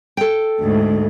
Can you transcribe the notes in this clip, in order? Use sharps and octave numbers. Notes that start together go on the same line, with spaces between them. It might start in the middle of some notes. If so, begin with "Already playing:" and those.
A4 G5
D2 G#2